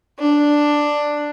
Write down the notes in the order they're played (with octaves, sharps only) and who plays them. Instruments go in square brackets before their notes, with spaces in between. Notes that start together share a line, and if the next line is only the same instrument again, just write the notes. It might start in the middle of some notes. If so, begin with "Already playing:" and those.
[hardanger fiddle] D4